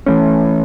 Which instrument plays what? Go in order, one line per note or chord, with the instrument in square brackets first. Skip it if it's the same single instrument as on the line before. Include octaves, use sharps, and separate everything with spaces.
[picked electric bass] E3 A3 C#4